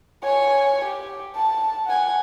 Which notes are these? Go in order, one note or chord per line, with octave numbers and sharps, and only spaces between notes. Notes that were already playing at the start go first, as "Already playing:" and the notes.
C#5 G#5
G4
A5
F#5 G#5